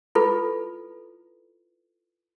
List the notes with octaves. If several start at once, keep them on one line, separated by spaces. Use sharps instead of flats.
E4 F4 A4 B4